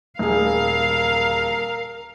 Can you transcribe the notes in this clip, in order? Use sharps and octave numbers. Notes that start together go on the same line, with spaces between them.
D#1 G#4 A#4 F5